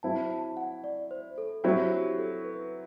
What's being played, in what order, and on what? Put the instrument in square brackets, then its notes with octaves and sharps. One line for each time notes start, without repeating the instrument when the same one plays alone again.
[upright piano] F#3 C4 E4 [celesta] A5
[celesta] A5
F#5
D5
C5
A4
[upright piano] F#3 C4 E4 [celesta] G4
[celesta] G4
A4
B4